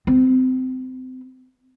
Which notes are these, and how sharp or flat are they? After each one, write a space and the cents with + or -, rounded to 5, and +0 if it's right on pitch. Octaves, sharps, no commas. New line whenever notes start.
C4 -25